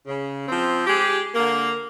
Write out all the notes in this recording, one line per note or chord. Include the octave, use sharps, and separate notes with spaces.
C#3
F3 C4
G#3 G4
D3 A#3